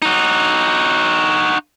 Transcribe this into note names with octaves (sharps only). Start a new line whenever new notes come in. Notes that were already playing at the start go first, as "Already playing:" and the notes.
D#4 F#4